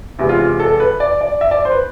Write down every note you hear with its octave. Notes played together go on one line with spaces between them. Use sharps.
E2 C3 G#3 E4
F4
F4
A4
B4
D5
D5
E5
D5
C5
B4